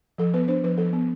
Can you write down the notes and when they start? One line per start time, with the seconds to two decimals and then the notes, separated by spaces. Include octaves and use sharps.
0.18 F3 A4
0.34 B3 B4
0.48 D4 C5
0.64 F3 B4
0.78 F3 A4
0.93 B3